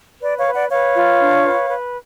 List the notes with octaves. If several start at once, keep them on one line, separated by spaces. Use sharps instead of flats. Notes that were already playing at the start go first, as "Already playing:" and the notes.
B4 D5
C#5 F5
B4
D5 F#5
B4 C#5 F5
F4
D4
B4
B4